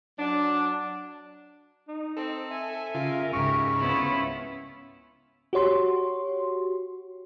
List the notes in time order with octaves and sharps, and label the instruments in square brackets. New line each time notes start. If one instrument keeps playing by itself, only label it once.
[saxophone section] F#3 D4
[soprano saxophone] D#4
[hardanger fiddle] C4 [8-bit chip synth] A4
[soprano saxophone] E5 [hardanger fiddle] G#5
[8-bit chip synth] C#3 F4 [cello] A#4
[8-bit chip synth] C#2 G#2 C#3 [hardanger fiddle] E4 G4 [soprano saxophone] C#6
[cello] B3 C#4 [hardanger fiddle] E4 F4
[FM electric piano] F#4 G4 C#5 C6